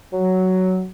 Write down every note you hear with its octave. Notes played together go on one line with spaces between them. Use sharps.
F#3